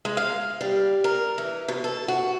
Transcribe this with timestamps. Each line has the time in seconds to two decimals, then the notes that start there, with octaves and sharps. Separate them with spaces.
0.05 G#3
0.17 F5
0.61 G3
1.04 A#4
1.38 E3
1.68 B2
1.84 A4
2.08 F#4